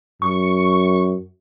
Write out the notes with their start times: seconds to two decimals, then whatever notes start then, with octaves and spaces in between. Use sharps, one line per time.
0.22 F#2 C#6